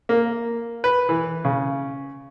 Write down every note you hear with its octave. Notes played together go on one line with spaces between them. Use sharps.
A#3
B4
E3
C#3